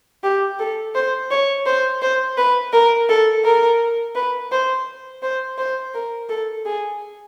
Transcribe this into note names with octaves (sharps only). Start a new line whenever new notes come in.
G4
A4
C5
C#5
C5
C5
B4
A#4
A4
A#4
B4
C5
C5
C5
A#4
A4
G#4